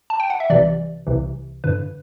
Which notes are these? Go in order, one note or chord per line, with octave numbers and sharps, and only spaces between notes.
A5
G5
F#5
E5
C2 C3 E3 D5
C2 C3 E3
G2 D3 B4